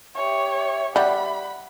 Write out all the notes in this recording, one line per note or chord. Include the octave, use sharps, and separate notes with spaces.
G4 C#5 E5
G3 F#5 B5